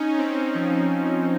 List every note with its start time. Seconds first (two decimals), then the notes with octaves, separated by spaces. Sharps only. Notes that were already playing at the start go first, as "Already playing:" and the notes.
Already playing: C#4 D#4
0.18 C4
0.55 F3